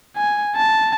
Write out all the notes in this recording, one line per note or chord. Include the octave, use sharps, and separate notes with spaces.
G#5
A5